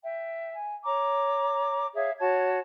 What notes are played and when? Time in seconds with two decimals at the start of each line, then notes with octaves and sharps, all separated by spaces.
0.03 E5 G5
0.54 G#5
0.84 C#5 A#5 D6
1.95 G#4 C#5 E5 F5
2.19 F#4 C#5 A5 G#6